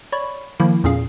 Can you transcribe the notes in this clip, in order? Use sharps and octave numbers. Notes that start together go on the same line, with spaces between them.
C#5 D5 B5 C#6
D#3 F3 A#3 E4
E2 A#2 C#4 G#4 F5